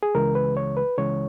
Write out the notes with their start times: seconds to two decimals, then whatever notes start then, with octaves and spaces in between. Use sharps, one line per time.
0.03 G#4
0.15 C#2 C#3 E3 G#3 A#4
0.35 B4
0.57 C#5
0.77 B4
0.98 C#2 C#3 E3 G#3 C#5